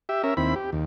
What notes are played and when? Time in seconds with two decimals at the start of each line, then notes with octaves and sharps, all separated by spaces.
0.09 G4 E5
0.23 C#4 A#4 E5
0.37 D#2 C4 E4 B5
0.56 G4
0.72 D#2